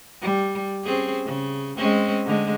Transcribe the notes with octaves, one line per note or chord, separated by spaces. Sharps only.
G3
C4 C#4 G#4
C#3
G#3 C4 C#4
D3 G#3